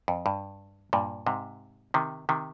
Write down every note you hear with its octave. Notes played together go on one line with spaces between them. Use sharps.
F2
G2
G2 A#2
G#2 C3
C3 D#3
C3 D#3